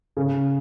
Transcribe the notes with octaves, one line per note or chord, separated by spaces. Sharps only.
C#3